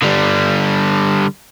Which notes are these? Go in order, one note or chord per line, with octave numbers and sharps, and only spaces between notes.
D3 G3